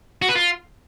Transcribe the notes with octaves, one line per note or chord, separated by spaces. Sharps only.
F#4
B4
F4